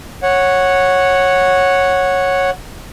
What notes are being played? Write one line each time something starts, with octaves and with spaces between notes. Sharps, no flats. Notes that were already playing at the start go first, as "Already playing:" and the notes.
C#5 F#5